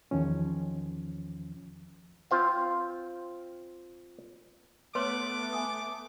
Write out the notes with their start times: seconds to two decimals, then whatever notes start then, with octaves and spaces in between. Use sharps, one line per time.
0.11 E2 D#3 F3 C#4
2.31 C4 F4 C5 F5
4.95 A3 B3 B4 C#5 C6 D6
5.53 G#5 D#6